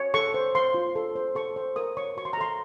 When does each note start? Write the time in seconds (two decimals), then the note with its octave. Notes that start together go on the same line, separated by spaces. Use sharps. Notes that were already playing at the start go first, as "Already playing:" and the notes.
Already playing: C#5
0.14 A4 C#6
0.34 C5
0.55 C5 C6
0.74 F4
0.96 A4
1.16 C5
1.35 A4 C#6
1.56 C5
1.76 A#4 D#6
1.97 C#5 C#6
2.17 F#4 C#6
2.25 C6
2.33 A#5
2.38 A4 C6